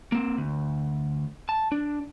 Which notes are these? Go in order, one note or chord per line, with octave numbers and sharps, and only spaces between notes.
A#3 C4
D2
A5
D4